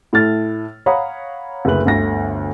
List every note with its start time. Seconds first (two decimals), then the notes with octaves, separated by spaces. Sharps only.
0.13 A2 A3 F6 A6
0.86 C#5 F5 F#5 A#5 B5 D#6
1.65 F#1 D2 G#4 B4 F#7
1.85 G1 D2 A#6